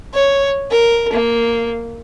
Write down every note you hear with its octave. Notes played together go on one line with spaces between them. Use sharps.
C#5
A#4
A#3